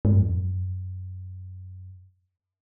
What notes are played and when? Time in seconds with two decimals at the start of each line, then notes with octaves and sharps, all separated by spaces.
0.05 G#2
0.13 F#2
0.22 F2
0.30 F#2